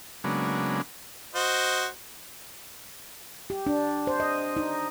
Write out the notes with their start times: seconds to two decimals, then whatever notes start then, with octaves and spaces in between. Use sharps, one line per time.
0.24 C#3 F#3 G#3 A#3 B3 D4
1.35 F#4 C5 D#5
3.50 G4
3.67 D4
4.07 C5
4.20 D#5
4.57 D#4